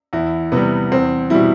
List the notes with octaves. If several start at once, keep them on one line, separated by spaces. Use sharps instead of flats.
E2 E4
C3 G3 B3
E2 C4
B2 G3 E4